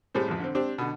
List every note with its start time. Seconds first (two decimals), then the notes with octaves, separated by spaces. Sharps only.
0.14 A2 G3 G#3 C4
0.28 A1 F2
0.40 D3 C4
0.55 C4 D4 G4
0.78 B2 D3